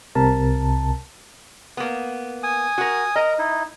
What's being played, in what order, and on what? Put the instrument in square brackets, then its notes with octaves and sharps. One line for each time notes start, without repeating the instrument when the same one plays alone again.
[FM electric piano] C2 C3 A#4 A5
[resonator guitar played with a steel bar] A#3 B3
[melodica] G#5 D#6
[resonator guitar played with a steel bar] F#4 A#4
[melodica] A#4 A#5 [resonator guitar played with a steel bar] D#5
[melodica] D#4 E4